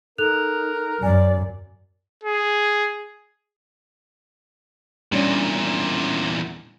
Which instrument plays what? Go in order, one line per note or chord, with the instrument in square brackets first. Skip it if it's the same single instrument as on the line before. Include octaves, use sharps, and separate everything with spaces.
[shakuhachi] D#4 [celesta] A4 F#6 F7 [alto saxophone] A#4
[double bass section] F#2 [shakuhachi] D5 [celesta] G#5
[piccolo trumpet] G#4
[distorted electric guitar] E2 A#2 [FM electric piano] G3 C#4 D4